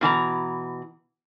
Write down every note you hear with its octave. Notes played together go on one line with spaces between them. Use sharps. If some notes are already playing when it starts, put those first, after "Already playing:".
B2 E3 A5 A#5